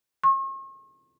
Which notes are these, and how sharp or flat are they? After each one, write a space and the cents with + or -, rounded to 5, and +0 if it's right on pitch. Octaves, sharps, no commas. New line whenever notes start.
C#6 -45